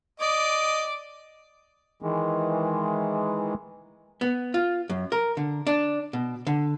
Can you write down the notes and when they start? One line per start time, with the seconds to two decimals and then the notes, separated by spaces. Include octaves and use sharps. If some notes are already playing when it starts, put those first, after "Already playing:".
0.20 D5 D#5 D6
2.02 D#3 E3 G#3
4.21 B3
4.54 F4
4.89 F#2
5.12 A#4
5.37 D3
5.67 D4
6.13 B2
6.47 D3